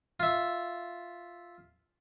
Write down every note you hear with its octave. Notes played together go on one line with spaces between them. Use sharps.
F4 E5